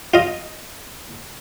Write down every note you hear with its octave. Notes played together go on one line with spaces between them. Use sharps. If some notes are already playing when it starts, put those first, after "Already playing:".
F4 D#5